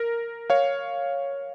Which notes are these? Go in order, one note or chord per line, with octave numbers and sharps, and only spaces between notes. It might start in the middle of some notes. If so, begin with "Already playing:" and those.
Already playing: A#4
C#5 F5